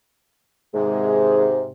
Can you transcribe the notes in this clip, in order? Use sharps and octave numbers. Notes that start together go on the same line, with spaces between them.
G#2 C3 D#3 G#3 G#4